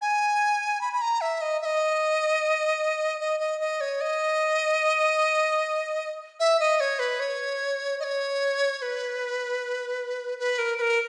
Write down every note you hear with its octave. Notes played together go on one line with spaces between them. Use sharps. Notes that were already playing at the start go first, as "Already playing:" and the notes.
G#5
B5
B5
A#5
E5
D#5
E5
D#5
D#5
D#5
D#5
C#5
D#5
E5
D#5
C#5
B4
C#5
D#5
C#5
C#5
B4
B4
A#4
B4
A#4